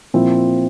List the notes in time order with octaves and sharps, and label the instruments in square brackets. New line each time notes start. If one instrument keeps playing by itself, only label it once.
[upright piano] A#2 F3 C4 E4